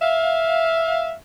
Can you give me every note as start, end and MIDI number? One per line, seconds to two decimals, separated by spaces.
0.01 1.13 76
0.01 1.13 77